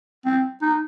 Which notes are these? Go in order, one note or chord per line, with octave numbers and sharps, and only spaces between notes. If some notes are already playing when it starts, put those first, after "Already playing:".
C4
D#4